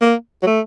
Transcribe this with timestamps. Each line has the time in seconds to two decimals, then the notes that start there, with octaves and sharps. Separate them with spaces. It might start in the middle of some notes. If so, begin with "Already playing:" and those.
0.01 A#3
0.42 F#3
0.46 A3